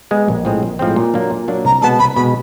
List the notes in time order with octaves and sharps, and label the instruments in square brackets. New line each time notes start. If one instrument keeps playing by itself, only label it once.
[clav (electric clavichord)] G#3 B3
A#1
A2 F3 G#3 C4
A#1
A2 F3 G#3 C4
A#2
F#3 A#3 D4
A#2
F#3 A#3 D4
[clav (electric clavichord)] C2 [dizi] A#5
[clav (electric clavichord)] B2 G#3 B3 [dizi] A5
[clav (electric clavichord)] C2 [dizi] B5
[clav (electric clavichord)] B2 G#3 B3 [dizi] B5